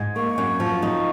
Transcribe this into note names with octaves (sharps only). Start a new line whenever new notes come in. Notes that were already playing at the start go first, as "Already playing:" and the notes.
Already playing: G#2
A#3 C#6
F#2
F3
D#4